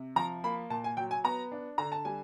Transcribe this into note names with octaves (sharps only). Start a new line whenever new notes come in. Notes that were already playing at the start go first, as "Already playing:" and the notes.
Already playing: C3
F3 A#5
A#3 B5
A#2 A5
G#5
F#3 G5
G#5
B3 A#5
D4
D3 A#5
A5
G3 G#5